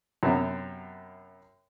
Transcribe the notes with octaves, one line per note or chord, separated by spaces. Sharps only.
F#2 C3 B3